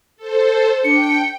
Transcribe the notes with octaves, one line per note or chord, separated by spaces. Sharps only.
A4 C5
D4 G5 C#7